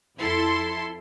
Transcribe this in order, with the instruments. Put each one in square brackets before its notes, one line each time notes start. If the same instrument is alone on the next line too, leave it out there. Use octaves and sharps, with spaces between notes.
[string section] F2 E4 A4 C6